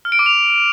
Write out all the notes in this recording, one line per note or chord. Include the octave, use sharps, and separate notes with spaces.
F6
D7
D6
F7